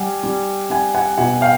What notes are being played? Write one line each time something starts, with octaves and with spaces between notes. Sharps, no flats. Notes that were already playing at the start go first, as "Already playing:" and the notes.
Already playing: G3 F#5 G#5
G3
G3 F#5 G#5
F#5 G#5
B2 F#5 G#5
F5 G5